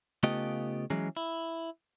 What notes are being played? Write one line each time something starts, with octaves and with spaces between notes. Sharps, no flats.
C#3 A3 B3 F4 G4 D#5
E3 F#3 G#3 C#4
E4